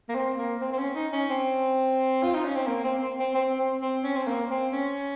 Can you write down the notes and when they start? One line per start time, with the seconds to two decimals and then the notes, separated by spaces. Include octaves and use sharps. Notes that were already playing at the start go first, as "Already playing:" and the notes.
0.09 A#3
0.15 C4
0.39 A#3
0.61 C4
0.73 C4
0.78 C#4
0.96 D#4
1.13 C#4
1.30 C4
2.23 F4
2.34 D#4
2.45 C#4
2.56 C4
2.67 A#3
2.84 C4
3.02 C4
3.19 C4
3.35 C4
3.59 C4
3.81 C4
4.04 C#4
4.16 C4
4.27 A#3
4.51 C4
4.73 C#4